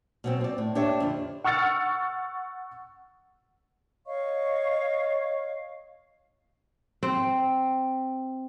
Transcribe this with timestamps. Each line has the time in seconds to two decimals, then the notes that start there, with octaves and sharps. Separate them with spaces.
0.24 B2 F#3 C4
0.41 C4 D5
0.58 A2
0.75 D4 G4 C#5 E5
1.00 F2 D3
1.44 F#5 C#6 E6 F6 A6 C#7
4.06 C#5 D#5 F5 C#6
7.03 C4